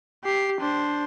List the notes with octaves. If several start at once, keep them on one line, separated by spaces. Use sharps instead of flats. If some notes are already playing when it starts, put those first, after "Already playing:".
G4 C7
D4 C5